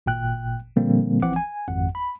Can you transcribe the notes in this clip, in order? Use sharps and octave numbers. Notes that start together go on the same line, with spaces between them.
G#1 A#2 G5 F#6
A#2 D3 F3 G3 A#3 C4
G#1 E3 F3 C4 F#5 D6
G#5
G#1 F2 F#5
B5